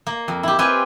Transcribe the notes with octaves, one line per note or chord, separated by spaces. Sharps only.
A#3
F2
E4 G4
C4 F4 G4 B4 G#5